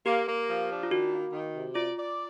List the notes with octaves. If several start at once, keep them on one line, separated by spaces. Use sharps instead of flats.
A#3 G4
A#3
F3
D4
F4
D#3 F#4
A#3
D#3
C3
F4 D5
D5